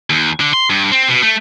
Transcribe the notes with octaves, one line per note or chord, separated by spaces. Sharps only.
D#2
D3
C6
G2
C4
B2
A3